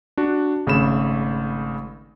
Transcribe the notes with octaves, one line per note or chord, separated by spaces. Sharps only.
D4 F#4
G#1 C#3 A3 B5 E7